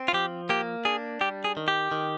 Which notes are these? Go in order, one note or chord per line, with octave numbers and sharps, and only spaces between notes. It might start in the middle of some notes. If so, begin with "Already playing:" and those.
Already playing: C4
F4
F3 G4
A#3 G4
D4 G#4
G3 G4
G#4
D#3
G4
D#3